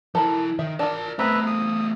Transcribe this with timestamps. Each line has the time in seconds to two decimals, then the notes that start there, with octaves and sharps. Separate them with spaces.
0.15 F3 E4 A4 A#4 B5
0.59 D#3 E5
0.79 D4 F4 A#4 A5
1.19 A3 B3 C4 B4 E5 A#5 B5
1.47 D#6